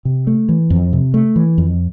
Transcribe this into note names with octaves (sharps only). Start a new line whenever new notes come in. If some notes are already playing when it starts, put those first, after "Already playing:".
C3
A3
E3
F2
C3
A3
E3
F2